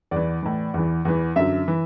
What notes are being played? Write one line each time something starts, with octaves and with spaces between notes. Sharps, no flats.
E2 E3 D5
A2 E3
E2 E3
E2 E3
F#2 D3 F#3 E5
E3